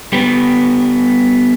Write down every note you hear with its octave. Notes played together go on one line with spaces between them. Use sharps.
G3 B3